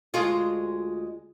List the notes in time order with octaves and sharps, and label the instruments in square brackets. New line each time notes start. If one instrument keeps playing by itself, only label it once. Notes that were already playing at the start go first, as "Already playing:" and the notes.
[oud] D2 G#3 F4